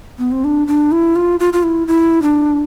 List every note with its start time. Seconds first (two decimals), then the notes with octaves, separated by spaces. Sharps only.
0.19 B3
0.32 C4
0.44 D4
0.68 D4
0.92 E4
1.16 F4
1.40 F4
1.53 F4
1.63 E4
1.88 E4
2.22 D4